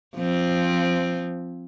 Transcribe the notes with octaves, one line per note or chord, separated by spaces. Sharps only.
F3 C4